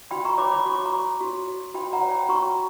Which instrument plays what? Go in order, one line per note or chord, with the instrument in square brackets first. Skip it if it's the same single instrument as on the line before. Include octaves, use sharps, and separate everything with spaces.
[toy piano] F#4 G5 B5
A#5 C#6
C#5 B5 D6
B5 D6
F#4 C#6
D6
A#5 C#6
C#5
F#4
C#5
F#4 G5 B5
F#5 A#5
C#5
G5 B5
F#4 A#5 C#6